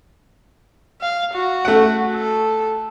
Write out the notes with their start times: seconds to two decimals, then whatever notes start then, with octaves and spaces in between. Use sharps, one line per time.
1.01 F5
1.33 F#4
1.65 A3 F#5
2.13 A4